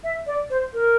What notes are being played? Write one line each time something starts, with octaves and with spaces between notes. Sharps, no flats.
E5
D5
C5
A#4